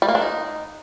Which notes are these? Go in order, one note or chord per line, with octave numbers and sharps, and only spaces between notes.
G3
A#3
D4
D#4